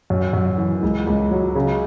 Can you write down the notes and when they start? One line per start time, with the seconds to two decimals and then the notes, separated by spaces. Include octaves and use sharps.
0.10 F#2
0.33 F#2
0.58 E3
0.83 C#2
1.07 C#2
1.31 F#3
1.55 C#3